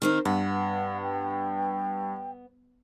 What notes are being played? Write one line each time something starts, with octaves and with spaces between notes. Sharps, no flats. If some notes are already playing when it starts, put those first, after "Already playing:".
D#3 C4 D#4 F6
G2 B3 F#5
G5